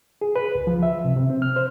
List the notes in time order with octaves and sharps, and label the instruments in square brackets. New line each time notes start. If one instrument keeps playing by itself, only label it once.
[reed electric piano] G#4
B4
C#2
F3
E5
C3
C3
C4
F6
C5